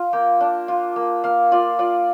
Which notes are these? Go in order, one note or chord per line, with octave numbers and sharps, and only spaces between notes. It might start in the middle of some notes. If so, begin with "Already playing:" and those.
Already playing: F4 F5
A#3 G5
D4
F4
A#3
A#3 F5
F4 D5
F4 D5